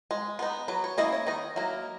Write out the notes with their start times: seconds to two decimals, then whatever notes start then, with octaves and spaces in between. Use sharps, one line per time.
0.11 G#3
0.39 B3 D#4
0.68 F#3 B4
0.84 C#5
0.98 A#3 C#4 E4 D#5
1.13 C#5
1.27 D#3 D#5
1.56 F#3 A#3 E4